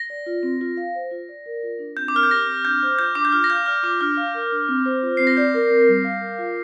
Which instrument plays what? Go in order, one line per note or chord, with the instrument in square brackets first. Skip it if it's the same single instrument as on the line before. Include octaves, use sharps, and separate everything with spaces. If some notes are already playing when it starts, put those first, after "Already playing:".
Already playing: [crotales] A#6
[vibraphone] D5
F4
C4
F4
F5
C5
F4
D5
A#4
F4
D4
[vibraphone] C4 [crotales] G6
[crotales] D6
[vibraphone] A#4 [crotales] F6
[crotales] G6
[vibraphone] G4 [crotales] A#6
[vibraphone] C4
[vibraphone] D4 [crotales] G6
[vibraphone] C5
[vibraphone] F4 [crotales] G6
[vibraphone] D4 [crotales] D6
[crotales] G6
[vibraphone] F4 [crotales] F6
[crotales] A#6
[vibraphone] F5 [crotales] G6
[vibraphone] D5 [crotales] F6
[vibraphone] F4 [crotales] D6
[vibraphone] D4 [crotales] F6
[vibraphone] F5
A#4
D4
C4
C5
F4
[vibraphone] C4 [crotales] C7
[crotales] A#6
[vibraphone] D5 [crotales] G6
[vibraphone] A#4
C4
G3
F5
A#4
F4